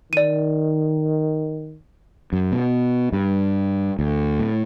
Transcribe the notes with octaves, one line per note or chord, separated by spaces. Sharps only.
D#3 D5 D#7
F#2
B2
G2
D2
A2